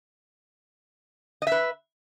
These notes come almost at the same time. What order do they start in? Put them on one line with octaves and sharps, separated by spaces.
D#5 E5 B4